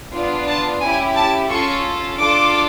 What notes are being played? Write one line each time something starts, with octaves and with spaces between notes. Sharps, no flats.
B3 D4 F4
A5
C#4 E4 G4 G#5
A5
C#4 F4 A4 C#6
D4 F4 A4 D6